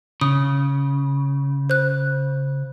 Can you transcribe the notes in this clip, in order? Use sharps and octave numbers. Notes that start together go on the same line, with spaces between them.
C#3 D#6
C5 F#6